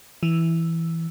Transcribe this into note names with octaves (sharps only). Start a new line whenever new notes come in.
E3